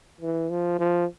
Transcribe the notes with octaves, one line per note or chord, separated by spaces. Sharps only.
E3
F3
F3